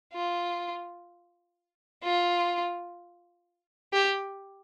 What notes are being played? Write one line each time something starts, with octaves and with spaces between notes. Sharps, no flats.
F4
F4
G4